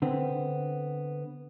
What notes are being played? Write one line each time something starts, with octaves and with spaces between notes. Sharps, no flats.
D3 B3 C4